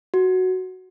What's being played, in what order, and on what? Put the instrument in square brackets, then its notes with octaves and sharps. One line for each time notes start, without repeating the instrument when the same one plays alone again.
[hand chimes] F#4